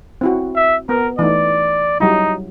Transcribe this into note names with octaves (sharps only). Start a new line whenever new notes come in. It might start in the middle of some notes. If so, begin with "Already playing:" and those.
C4 E4 F#4
E5
B3 A#4
E3 A3 D#4 D5
F#3 G3 D#4 E4